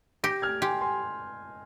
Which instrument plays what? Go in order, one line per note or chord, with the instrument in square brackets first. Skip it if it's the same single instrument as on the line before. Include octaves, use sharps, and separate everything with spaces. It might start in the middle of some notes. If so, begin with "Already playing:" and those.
[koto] G4 [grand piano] G6 A#6
[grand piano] F6 G#6
[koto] G4 [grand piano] G#5 C6
[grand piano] G#5 C6